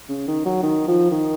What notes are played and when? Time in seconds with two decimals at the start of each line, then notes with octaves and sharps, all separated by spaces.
0.09 C#3
0.28 D#3
0.46 F#3
0.63 D#3
0.88 F3
1.11 D#3